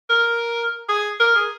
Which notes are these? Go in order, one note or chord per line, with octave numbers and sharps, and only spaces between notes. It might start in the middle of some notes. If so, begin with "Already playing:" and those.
A#4
G#4
A#4
G#4